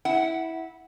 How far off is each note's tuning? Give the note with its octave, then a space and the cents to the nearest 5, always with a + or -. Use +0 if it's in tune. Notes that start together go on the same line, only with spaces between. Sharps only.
E4 -15 F#5 +0